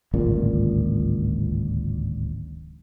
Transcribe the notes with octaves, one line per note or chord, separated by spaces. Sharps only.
D1 G#1 C#2 A#2